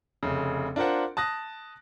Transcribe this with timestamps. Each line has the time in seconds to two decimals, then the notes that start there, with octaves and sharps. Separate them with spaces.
0.23 F1 C#3
0.76 D4 F4 A#4 C5 F#5
1.17 A5 D#6 F#6 A#6